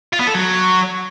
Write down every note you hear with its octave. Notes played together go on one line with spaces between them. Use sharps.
F4
B3
A4
F#3